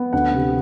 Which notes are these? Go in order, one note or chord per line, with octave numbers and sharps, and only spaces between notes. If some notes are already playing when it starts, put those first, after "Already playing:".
Already playing: B3
D2 F#5
C3